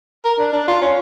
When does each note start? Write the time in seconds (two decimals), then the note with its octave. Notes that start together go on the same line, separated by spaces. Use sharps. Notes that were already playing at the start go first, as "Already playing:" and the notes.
0.25 A#4
0.39 D4
0.53 D4
0.68 F4
0.82 C#4